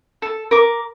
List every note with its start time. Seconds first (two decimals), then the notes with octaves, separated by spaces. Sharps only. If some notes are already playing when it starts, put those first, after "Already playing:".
0.22 A4
0.51 A#4 D6